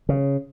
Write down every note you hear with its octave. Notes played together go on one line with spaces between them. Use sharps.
C#3